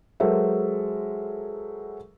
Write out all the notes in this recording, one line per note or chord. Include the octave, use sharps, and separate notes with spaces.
F#3 G#3 A4 A#4 C5 E5